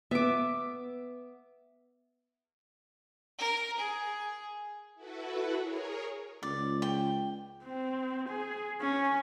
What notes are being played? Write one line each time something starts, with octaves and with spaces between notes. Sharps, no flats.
B3 E5 D6
A#4
G#4
E4 F#4 A4 B4
G#4 A#4 C#5
C#2 D5
G5
C4
G#4
C#4